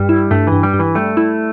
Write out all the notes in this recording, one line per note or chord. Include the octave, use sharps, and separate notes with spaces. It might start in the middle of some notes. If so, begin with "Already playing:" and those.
Already playing: G2 G3
E4
G2 A3
G2 E3
G3
G2
E3
G3 A3
E4